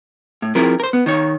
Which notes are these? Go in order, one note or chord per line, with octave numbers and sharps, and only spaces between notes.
A2
F3 C4 E4 G#4 A#4
A#4 C5
B3
D#3 D#4 C#5